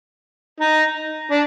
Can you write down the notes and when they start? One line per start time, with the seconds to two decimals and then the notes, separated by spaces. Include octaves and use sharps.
0.60 D#4
1.31 D4